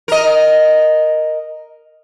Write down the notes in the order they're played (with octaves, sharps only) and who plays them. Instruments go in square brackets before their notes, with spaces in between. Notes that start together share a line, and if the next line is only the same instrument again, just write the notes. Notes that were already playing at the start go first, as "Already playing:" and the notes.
[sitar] A#4 D#5